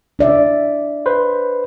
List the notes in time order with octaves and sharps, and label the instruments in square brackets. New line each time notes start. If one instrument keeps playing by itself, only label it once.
[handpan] D4 D5 E5
[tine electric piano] B4 C5